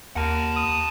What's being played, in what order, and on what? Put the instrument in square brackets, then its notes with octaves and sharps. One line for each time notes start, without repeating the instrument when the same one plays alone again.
[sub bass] D#2 [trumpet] A#4 [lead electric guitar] F#5 A5
[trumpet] D#6